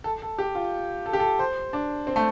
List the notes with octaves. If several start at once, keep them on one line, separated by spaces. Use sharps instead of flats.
A4
A4
G4
F4
A4
G4
A4
C5
D4
C4
A3